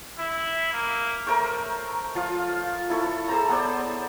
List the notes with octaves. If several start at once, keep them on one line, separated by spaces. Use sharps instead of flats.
E4
A#3
A3 A#4 C5 C#6
F3 F4 F5
E4 A4 C#6
G#4 A4 C5 A#5
B3 C5 D5